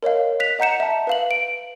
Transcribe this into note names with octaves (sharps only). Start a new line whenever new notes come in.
A#4 C#5 D#5 F5
F#6 B6 F7
D#5 F#5 A#5 G6 C#7 E7
E5 A5
B4 F5 F#7
D7